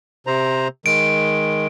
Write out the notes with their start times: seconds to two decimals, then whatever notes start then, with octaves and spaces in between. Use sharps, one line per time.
0.27 C3 C5 A#5
0.86 D#3 G#3 D7